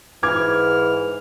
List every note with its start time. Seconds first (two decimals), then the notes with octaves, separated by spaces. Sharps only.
0.23 G#2 E3 D6 F6 G#6